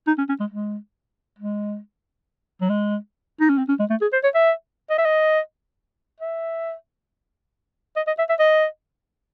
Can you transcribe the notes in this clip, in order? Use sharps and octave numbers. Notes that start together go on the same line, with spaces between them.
D#4
C#4
C#4
G#3
G#3
G#3
F#3
G#3
D#4
C#4
C4
C#4
G#3
A3
G#4
C5
C#5
E5
D#5
E5
D#5
E5
D#5
D#5
E5
E5
D#5